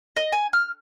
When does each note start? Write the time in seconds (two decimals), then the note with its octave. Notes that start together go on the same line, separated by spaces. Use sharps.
0.17 D#5
0.32 G#5
0.53 F6